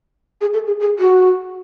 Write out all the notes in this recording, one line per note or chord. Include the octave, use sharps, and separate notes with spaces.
G#4
A4
G#4
G#4
F#4